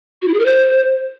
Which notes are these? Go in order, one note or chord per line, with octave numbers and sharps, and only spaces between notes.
F#4
E4
G#4
A#4
C5